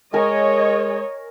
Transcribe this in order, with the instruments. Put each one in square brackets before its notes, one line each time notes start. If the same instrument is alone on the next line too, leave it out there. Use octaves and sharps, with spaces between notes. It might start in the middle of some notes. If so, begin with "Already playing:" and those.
[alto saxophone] G#3 [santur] A#4 G#5 [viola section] C#5 D#5